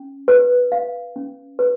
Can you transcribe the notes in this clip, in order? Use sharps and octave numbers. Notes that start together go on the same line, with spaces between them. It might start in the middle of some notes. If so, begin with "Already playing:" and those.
Already playing: C#4
B4
F5
C#4
B4